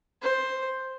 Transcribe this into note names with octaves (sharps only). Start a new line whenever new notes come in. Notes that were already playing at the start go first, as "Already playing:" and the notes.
C5